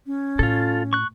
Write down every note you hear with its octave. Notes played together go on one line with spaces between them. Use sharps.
C#4
A2 F4 A4
C#6 F#6